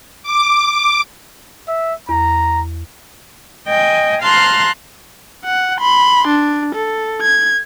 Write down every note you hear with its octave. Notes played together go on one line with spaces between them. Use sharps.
D6
E5
E2 A#5
D#5 G5 G#5
F5 A5 A#5 C6 F6 F#6
F#5
B5 C6
D4
A4
G#6